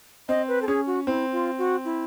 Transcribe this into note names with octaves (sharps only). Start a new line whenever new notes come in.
C4 D#5
B4
A4
C#4 G#4
F#4
C4 E4
F4
F#4
E4